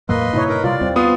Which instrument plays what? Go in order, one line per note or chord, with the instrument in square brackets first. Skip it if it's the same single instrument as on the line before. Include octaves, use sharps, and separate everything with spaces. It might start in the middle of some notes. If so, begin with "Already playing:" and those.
[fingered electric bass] E2 A2 F#3 [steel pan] A#3 [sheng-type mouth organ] B4 D#5 C6
[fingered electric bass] G2 A#2 C#3 [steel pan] D#4 E4 C#5
[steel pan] D#4 [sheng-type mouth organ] A#4 B4
[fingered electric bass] C3 G3 [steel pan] F4 [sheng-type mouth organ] D5
[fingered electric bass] D#2 G3 [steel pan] C4
[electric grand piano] B3 F4 D#6 [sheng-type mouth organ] C6